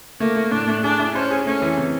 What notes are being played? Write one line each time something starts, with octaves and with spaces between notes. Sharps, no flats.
A3 A#3
A3
A2 D4
A3
D4 G#4
E4
C#4 C5
G#4
A3 C#4
E3
C3